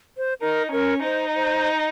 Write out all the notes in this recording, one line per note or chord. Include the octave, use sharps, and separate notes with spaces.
C5
D#4 A#4
C#4 A#4
D#4 C5
C5